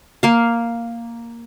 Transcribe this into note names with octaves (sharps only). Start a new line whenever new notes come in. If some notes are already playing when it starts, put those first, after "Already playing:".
A#3 F5